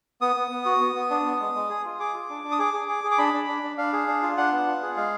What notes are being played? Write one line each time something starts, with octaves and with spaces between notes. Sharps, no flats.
B3 D#6
B3
B3
F#4
B3
B3
D4
B3
G#3
G#3
G#4
F4
G#4 D6
F4
D4
D4
D#6
G#4 D6
G#4
G#4
G#4
D6
D4 B5
D4
D4
D4
D4 F5
G#4
D4
F4
D4 F#5
B3
F4
G#4
G#3 F5